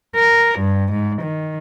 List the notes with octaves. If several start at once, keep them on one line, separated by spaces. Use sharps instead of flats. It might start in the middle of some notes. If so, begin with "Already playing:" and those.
A#4
G2
G#2
D#3